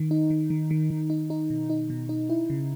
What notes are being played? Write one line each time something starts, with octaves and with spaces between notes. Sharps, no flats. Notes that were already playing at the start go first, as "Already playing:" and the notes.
Already playing: D#3
D#4
D#3
D#3
D#3
D#3
D#4
D#4
B2
D#4
B2
D#4
E4
C#3